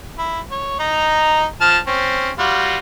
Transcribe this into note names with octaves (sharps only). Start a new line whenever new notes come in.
E4
C#5
D#4 A#5
F3 A5 F6
C4 C#4
G3 F4 F#4